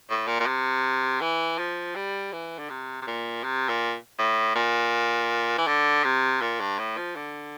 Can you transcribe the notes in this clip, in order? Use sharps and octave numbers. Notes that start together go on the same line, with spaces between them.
A2
A#2
A#2
C3
E3
F3
G3
E3
D3
C3
C3
A#2
C3
A#2
A2
A#2
E3
D3
C3
A#2
G2
A2
F3
D3